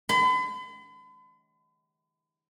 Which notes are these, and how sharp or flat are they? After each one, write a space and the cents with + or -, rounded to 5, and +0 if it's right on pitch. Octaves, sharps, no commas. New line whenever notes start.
B5 +45